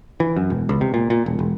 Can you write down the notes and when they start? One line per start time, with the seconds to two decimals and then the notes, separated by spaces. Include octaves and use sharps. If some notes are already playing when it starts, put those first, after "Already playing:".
0.20 E3
0.36 F#2
0.50 E1
0.69 C#2
0.81 C3
0.94 A#2
1.10 A#2
1.26 E1
1.39 E1